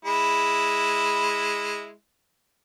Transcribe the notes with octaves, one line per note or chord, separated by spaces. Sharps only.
G#3 E4